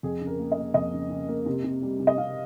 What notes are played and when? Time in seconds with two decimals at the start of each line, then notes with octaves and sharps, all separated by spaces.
0.03 F2 G#4
0.21 C#3
0.27 A#4
0.39 A#3
0.52 D#5
0.57 A#3
0.74 F2 D#5
0.93 C#3
1.10 C#3
1.28 A#3
1.46 C3
1.64 C3
1.82 G3
2.00 C3
2.07 D#5
2.18 C3 F5